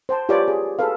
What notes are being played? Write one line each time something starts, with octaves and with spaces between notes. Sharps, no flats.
C5 G5 A5
F4 G4 B4 C#5 D5 G5
G#4
G#4 A4 B4 F5